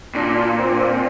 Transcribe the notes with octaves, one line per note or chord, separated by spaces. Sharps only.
A#2 D4
F4
F4
C4
D4
C4